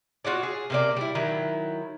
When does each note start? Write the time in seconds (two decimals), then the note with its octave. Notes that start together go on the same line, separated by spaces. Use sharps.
0.25 F4 F#4 C#5 D5
0.43 G#4
0.70 C3 A#3 D5
0.97 G3 E4
1.15 D#3 F#3 E4